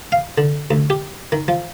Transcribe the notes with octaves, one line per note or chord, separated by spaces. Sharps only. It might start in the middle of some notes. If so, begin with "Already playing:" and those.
F5
D3
D2
G4
D#3
F3